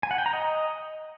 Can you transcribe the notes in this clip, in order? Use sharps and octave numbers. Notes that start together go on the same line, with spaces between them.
G#5
F#5
G5
A#5
D#5